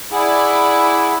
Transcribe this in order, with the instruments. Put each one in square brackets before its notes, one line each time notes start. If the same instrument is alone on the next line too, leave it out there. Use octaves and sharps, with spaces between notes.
[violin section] E4 D5 [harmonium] G#4 F#5 G#5